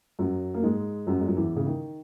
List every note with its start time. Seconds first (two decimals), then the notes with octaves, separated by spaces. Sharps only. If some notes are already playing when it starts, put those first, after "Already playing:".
0.19 F#2 F#3
0.54 A#3
0.63 G#2 G#3
1.07 F#2 F#3
1.21 G#3
1.28 F#3
1.37 E2 E3
1.56 C#3
1.66 D#3